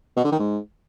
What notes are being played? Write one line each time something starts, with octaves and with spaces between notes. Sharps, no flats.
B2
D3
D#3
G#2